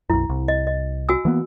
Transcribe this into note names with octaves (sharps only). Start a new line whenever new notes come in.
B1 F#2 E4
C2
D#5
D#5
F#4 G#5 E6
E3 A#3 B3